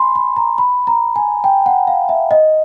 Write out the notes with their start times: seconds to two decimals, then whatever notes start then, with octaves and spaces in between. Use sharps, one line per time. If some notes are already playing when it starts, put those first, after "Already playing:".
Already playing: G#5 B5 C6
0.15 B5
0.36 A#5
0.58 B5
0.87 A#5
1.16 G#5
1.44 G5
1.66 F#5
1.87 F5
2.09 E5
2.31 D#5